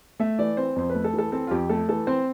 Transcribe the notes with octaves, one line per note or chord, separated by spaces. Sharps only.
A3 E5
E3 D5
C4 C5
F2 C5
B4
A3
A4
E3
A4
C4 A4
F4
F2 G4
A3 A4
E3 A4
C4 C5